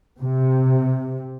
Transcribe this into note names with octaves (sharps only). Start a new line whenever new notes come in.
C3